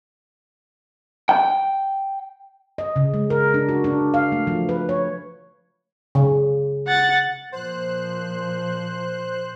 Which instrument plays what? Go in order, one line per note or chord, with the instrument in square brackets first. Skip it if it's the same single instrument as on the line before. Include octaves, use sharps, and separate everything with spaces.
[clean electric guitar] G5
[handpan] D#5
C#3
G#3
A#4
D4
F#4
D4
F5
A3
F3
B4
C#5
[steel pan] C#3
[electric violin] F#5 A6
[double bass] A#2 F3 [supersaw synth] C5 F#6